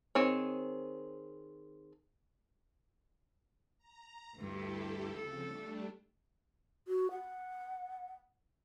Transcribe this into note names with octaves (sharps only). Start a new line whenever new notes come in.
D#3 C4 G#4 C#5
A#5
D2 G2 E4 G4 A4
C#3 F3 C4 A4
G3 A3 D4
F#4
F#5